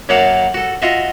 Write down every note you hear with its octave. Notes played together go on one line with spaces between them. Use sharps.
F#2 F#3 A#3 F5 F#5 A5
F#4 A4
F4 F#4 D#5 E5